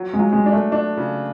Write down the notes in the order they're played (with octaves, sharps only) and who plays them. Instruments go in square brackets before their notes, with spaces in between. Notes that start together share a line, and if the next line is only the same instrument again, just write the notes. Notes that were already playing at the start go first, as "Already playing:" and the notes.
Already playing: [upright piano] F#3
[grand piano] G#3
[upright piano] F#3
[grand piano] G#3
[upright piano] D4
[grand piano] A3
[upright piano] D4
C#3